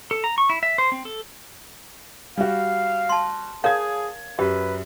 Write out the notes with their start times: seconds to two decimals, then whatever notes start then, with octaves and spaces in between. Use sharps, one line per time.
0.11 A4
0.24 A#5
0.38 C#6
0.50 E4
0.63 E5
0.78 C5
0.92 C4
1.05 A4
2.37 G3 F#4 F5
3.09 A5 C6
3.64 G#4 A#4 C#5 F5 A5 G#6
4.39 F#2 G4 B4